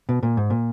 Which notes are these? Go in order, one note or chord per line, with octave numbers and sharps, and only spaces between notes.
B2
A#2
G#2
A#2